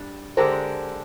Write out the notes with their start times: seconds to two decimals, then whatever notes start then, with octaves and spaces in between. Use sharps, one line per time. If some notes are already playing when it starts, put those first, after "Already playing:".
Already playing: G3 D4
0.37 D3 G#3 D4 G4 A#4 C5